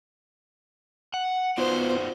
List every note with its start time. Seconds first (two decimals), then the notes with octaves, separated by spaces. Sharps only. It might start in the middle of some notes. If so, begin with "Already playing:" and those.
1.14 F#5
1.58 B3 D#4 F4 F#4 C5 D5